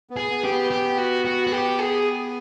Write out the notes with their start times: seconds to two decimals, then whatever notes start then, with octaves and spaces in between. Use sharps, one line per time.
0.10 B3
0.17 G#4
0.31 B3
0.44 G4
0.51 B3
0.71 G4
0.98 F#4
1.25 F#4
1.47 F#4
1.52 G4
1.79 G#4